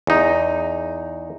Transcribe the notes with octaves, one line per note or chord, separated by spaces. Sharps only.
E2 D#4